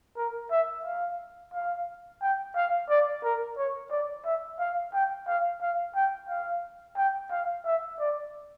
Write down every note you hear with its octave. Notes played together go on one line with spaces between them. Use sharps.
A#4
E5
F5
F5
G5
F5
D5
A#4
C#5
D5
E5
F5
G5
F5
F5
G5
F5
G5
F5
E5
D5